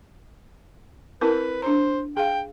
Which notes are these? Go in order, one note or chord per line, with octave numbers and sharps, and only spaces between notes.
C4 E4 A#4 B4
D4 C5 A#5
G#4 F5 G5